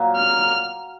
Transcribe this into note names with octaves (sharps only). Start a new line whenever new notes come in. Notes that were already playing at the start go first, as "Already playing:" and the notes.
Already playing: A#2 F#3 A#3
F6